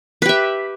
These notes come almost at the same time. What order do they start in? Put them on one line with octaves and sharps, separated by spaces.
B4 G4 E5